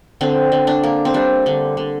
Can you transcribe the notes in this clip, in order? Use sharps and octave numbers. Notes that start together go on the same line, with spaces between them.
D3 C4
D3
D4
A#3
C4
G3 D4
D3
D3